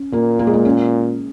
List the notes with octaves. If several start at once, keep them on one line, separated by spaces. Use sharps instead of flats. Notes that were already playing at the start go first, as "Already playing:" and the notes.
Already playing: C#4
A#2 A#3
A#3
G#3
A#3
C#4